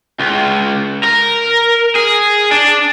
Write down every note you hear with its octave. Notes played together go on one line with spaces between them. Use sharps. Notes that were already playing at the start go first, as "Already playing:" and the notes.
C#2
A#4
G#4
D4